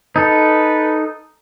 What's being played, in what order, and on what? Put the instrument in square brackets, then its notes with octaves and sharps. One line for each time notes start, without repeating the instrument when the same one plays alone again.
[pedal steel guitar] D#4 A4 [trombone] B4